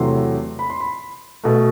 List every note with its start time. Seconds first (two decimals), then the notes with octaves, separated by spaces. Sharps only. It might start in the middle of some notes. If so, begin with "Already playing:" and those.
Already playing: E2 C3 F#3 A3 C6
0.59 B5
0.70 C6
0.80 B5
1.44 B2 A3